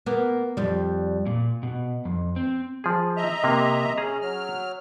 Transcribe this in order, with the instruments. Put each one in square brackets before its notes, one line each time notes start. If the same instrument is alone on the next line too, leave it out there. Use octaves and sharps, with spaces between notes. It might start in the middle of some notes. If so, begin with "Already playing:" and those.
[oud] A#3 B3
F2 G3
[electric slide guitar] A#2
B2
F2
C4
[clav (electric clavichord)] F3 G#4
[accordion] D#5 E5 A#5
[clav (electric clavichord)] C3 A#3
[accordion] C#4 [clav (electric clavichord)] G#4 A#5
[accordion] F#3 F6